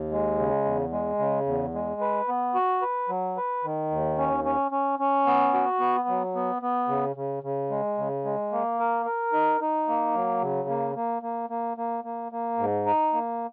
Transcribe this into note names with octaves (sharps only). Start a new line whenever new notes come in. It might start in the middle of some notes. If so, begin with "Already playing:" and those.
Already playing: D#2
G#3
C#3
E2
G#3
C#3
E2
G#3
B4
B3
F#4
B4
F#3
B4
D#3
D#2
C#4
C#4
C#4
C#4
B3
F#4
B3
F#3
B3
B3
C#3
C#3
C#3
G#3
C#3
G#3
A#3
A#4
A#4
D#4
D#4
A#3
F#3
C#3
A#3
A#3
A#3
A#3
A#3
A#3
A#3
G#2
D#4
A#3